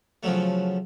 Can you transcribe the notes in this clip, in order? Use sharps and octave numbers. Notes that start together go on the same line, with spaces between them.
C#3 F3 F#3 A3